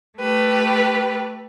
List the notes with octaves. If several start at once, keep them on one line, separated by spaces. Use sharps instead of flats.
A3 G4 B4